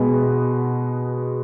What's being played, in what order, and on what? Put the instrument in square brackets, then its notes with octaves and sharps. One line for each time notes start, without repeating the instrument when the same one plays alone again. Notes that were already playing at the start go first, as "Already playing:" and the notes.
Already playing: [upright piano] B2 G#3 B3 B4